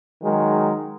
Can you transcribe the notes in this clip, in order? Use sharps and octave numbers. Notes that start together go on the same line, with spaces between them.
D#3 F#3 G#3